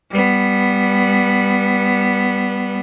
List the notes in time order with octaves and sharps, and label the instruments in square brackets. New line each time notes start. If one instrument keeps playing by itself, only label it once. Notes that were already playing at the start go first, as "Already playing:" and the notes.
[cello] G3 B3